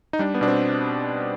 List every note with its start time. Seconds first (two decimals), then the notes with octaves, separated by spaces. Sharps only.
0.13 D#4
0.19 G3 D4
0.34 B3
0.41 B2 D4
0.47 C4